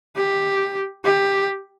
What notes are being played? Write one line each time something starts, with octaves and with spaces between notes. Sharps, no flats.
G4
G4